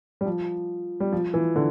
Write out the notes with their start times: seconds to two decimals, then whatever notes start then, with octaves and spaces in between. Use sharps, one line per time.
0.21 G3
0.26 F3
1.00 G3
1.12 F3
1.34 E3
1.56 D3